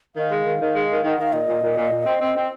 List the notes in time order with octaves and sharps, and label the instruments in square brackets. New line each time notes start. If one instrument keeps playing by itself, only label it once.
[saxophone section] D#3 [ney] F5
[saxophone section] G#3
D#3
D#3
G#3
D#3
D#3
[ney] F#5
[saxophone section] D#3 [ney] F5
[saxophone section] A#2 [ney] D#5
[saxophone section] A#2
A#2
A#2
A#2
C4
C4
C4